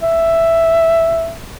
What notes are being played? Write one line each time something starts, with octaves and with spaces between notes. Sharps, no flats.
E5